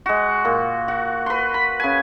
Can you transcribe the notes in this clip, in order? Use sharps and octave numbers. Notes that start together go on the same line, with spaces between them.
G#3 F#4
A#2
F#4
B4 C6
B5
C#3 G#5